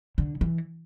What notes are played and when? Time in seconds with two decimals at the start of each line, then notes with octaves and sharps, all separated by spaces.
0.18 D3
0.41 E3